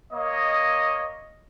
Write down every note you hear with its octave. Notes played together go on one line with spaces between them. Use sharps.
A#3 C#5 D#5